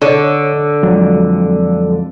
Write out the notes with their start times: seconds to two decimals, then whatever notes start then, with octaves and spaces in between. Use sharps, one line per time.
0.02 D3 D4 C#5 D#5
0.83 F2 F#3 G#3